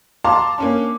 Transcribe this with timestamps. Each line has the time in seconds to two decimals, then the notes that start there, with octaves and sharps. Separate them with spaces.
0.24 F5 A5 A#5 C6 D6
0.58 A#3 C#4 D4